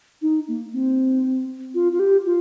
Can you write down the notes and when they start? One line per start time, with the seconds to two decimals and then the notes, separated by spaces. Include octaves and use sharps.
0.22 D#4
0.48 A#3
0.73 C4
1.74 F4
1.92 F4
1.99 G4
2.26 F4